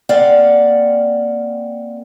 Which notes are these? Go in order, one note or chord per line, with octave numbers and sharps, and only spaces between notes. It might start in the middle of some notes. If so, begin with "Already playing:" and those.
A#3 C4 D5 F5 F#5